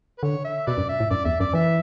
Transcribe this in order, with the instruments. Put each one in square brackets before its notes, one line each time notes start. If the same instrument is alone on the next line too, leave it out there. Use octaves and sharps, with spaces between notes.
[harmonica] B4
[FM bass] D3 [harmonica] C#5
[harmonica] E5
[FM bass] B2 [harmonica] B4 D5
[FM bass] F#2
[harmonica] E5
[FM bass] A2
[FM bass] F#2 [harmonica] D5
[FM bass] E2 [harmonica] E5
[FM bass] F#2 [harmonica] D5
[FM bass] E3 [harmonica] E5